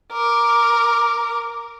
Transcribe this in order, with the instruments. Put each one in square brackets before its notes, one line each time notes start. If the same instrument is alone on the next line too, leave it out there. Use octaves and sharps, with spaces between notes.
[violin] A#4 D6